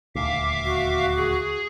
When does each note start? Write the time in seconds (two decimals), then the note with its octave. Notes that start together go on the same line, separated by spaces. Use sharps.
0.15 D#1 D2 E5 F5 D6
0.65 F#4
1.16 G#4